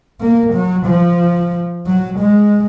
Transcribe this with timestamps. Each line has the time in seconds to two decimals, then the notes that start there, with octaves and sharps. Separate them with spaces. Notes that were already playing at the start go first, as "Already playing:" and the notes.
0.21 A#3
0.53 F#3
0.86 F3
1.87 F#3
2.19 G#3